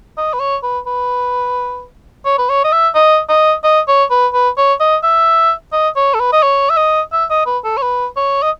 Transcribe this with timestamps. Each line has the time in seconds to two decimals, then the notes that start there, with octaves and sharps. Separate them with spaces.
0.18 D#5
0.33 B4
0.40 C#5
0.63 B4
0.86 B4
2.25 C#5
2.38 B4
2.49 C#5
2.64 D#5
2.72 E5
2.95 D#5
3.29 D#5
3.64 D#5
3.88 C#5
4.10 B4
4.33 B4
4.57 C#5
4.80 D#5
5.03 E5
5.72 D#5
5.96 C#5
6.14 A4
6.20 B4
6.32 D#5
6.43 C#5
6.70 E5
6.76 D#5
7.12 E5
7.30 D#5
7.46 B4
7.64 A4
7.77 C#5
7.82 B4
8.17 C#5
8.42 D#5